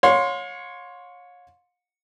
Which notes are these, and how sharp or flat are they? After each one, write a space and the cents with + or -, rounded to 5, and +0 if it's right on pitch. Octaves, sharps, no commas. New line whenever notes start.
C#5 +0 F5 +40 C6 +0